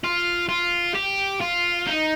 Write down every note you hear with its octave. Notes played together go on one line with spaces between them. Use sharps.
F4
F4
G4
F4
D#4